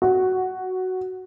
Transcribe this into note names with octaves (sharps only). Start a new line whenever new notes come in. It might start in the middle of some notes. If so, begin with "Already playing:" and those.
F#4